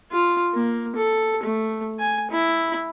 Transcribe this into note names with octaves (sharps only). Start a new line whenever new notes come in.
F4
A#3
A4
A3
G#5
E4